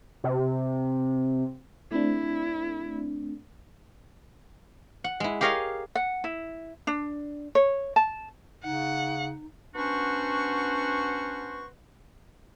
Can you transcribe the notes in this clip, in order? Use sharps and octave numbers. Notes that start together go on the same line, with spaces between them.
C3
A3 C4 D4 E4
F#5
G#3 E4
G4 G#4 A#4 C#5 D#5 F5
F#5
E4
D4
C#5
A5
C#3 D#4 F#5
B3 C#4 D4 F#4 C5 C#6